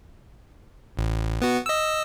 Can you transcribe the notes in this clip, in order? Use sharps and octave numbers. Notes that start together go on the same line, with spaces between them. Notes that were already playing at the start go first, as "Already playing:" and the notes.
A1
B3 F#4
D#5 E6